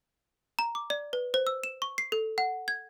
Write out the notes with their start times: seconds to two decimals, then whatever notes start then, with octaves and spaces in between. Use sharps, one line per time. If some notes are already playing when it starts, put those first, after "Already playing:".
0.59 A#5
0.75 D6
0.90 D5
1.13 B4
1.34 C5
1.47 E6
1.64 E7
1.82 C#6
1.98 C7
2.12 A4
2.38 F#5
2.68 G#6